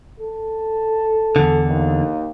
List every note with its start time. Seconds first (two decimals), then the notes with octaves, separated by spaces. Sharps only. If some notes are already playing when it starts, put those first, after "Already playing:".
0.20 A4
1.36 E2 D3
1.68 D#2